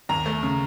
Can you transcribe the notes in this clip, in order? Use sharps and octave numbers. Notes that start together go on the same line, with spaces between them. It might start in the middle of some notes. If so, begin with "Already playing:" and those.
D#2 A#5
A3
C#3